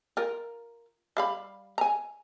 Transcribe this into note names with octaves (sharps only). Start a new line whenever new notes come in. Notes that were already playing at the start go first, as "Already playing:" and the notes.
F4 A#4
G3 F5 B5
G#5 A#5